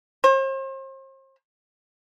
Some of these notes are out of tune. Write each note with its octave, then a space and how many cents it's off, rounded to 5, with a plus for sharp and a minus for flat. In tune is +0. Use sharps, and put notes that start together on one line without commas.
C5 +40